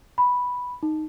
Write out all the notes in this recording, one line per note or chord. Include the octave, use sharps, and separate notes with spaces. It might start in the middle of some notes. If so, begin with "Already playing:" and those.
B5
D#4